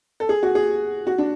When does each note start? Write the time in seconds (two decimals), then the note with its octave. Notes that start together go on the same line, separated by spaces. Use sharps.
0.20 A4
0.29 G#4
0.43 F#4
0.55 G#4
1.07 F#4
1.18 D4